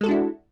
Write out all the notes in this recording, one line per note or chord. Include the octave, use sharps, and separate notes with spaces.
G#3 D4 E4 F#4 A4